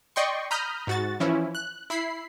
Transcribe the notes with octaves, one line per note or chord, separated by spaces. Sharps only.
D5 D#5 G5 C6 C#6
A#5 B5 D#6 F6 G6
G#2 F#4 A6
E3 F3 C#4 E4
F#6
E4 B5 C7